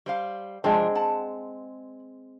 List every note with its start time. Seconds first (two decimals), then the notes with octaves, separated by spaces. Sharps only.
0.06 G3 C5 F5
0.64 C3 F3 G#3 C4 D4
0.95 F#5 A5